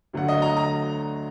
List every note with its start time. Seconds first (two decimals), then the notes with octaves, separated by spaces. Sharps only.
0.13 D2 D3 F#3 A3 F#5
0.28 D#5
0.42 A#5
0.57 A#5